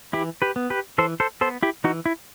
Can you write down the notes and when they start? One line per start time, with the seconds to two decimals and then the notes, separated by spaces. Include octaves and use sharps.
0.13 E3 E4 G4
0.42 G4 B4
0.56 B3
0.70 G4 B4
0.98 E3 A4 C5
1.20 A4 C5
1.41 B3 A4 C5
1.63 E4 G4
1.84 E3 D#4 F#4
2.06 E4